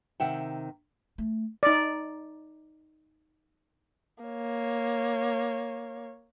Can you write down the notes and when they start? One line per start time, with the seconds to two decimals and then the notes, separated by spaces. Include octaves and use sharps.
0.20 C3 D#3 E5 F#5 G5
1.18 A3
1.63 D#4 D5
4.24 A#3 C#5